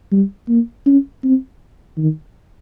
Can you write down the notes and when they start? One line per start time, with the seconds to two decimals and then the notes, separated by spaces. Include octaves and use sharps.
0.11 G3
0.48 A#3
0.86 C#4
1.24 C4
1.98 D#3